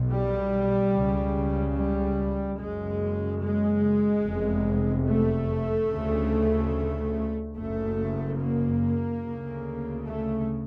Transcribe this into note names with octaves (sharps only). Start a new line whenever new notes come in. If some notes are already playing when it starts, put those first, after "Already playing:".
Already playing: B1 B2
G3
C#2 C#3
G3
F#1 F#2 C#3 G#3
G#3
F1 E2 C3
A3
D2 C#3
F#1 F#2 C#3 A3
A#3
D2 C#3
A3